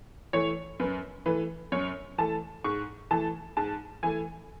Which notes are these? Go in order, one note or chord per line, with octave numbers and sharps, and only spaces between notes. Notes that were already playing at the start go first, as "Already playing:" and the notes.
E3 A3 C#5
F#2 B4
E3 A3 B4
F#2 C#5
E3 A3 A5
G#2 C#6
E3 A3 A5
G#2 A5
E3 A3 G#5